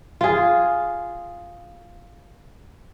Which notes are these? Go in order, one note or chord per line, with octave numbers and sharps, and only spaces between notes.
F4 G#4